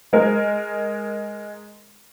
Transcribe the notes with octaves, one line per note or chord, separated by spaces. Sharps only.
G#3 A#4